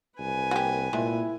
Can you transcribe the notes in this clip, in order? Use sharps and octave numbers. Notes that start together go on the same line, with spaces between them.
C2 B4 G#5
A#3 F#4 G4
A#2 G#3 A3 C4 E4